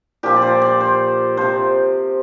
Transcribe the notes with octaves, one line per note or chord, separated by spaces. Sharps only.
A#2 F3 G4
D5
C5
D5
C5
C3 F3 C5